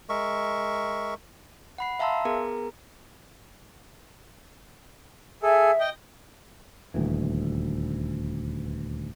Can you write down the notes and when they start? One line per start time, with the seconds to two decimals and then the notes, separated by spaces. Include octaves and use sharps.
0.09 G#3 A#4 E5 C#6
1.78 F#5 B5 C7
1.99 E5 F5 A5 A#5 C6 E6
2.25 B3 G#4 A#4 A#5
5.43 G#4 A4 E5
5.80 D#5 G5
6.94 D#1 D2 E3